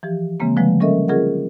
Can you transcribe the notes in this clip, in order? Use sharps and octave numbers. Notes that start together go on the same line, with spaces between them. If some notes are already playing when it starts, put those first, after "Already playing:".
E3 F3 G4
C#3 E3 G#3 A#3 C4
D3 F3 F#3 G#3 A3 B4
G3 C#4 A4 A#4 D#5 E5
C#4 F4 G#4 A#4 D#5 F#5